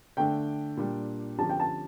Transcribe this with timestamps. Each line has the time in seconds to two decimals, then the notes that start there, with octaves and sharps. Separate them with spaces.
0.17 D3 A3 D4 G5
0.77 A#2 G3 D4
1.38 D3 F3 C#4 G4 A5
1.49 G5
1.60 A5